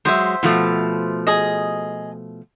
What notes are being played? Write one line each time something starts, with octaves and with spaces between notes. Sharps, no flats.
F#3 G#3 C5 E5
B2 F3 A3
G#4 D#5